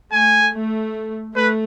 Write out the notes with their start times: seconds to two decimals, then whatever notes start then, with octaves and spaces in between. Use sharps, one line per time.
0.12 A3 G#5
0.53 A3
1.35 A3 B4